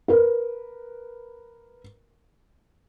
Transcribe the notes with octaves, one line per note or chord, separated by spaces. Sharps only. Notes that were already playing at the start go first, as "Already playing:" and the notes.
A#4 B4